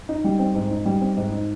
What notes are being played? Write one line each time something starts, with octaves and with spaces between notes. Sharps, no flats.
D#4
G3
C4
G#2
D#4
G3
C4
G#2
D#4